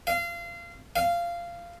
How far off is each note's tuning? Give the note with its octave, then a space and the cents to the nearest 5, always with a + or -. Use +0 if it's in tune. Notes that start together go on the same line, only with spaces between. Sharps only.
F5 -25
F5 -15